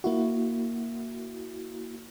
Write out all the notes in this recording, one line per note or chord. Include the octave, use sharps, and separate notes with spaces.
A#3 E4 F#4